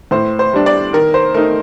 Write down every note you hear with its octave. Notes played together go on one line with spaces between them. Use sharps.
A2 C5
C5
G3 D4
D5
D#3 A#4
C5
A3 D#4 A#4